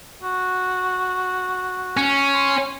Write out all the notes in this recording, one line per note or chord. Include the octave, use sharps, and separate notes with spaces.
F#4
C#4
C6